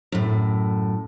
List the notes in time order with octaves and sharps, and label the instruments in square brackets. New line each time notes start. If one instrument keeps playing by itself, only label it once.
[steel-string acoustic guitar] F#2 A2